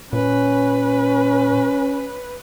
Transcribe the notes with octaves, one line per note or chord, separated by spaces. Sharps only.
A#2 C#4 B4